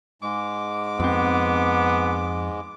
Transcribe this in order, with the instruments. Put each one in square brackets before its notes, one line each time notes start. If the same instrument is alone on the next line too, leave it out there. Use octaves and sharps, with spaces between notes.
[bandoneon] G#2 G#3 [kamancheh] D6
[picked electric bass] F2 C4 [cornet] B3